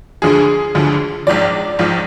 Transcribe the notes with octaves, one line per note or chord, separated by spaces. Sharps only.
D2 D3 F3 G#4
D2 D3 F3
A#1 G#2 F3 D5
A#1 G#2 F3